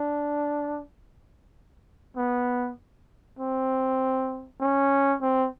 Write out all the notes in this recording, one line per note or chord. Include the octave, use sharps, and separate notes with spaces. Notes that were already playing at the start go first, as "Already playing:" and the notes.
Already playing: D4
B3
C4
C#4
C4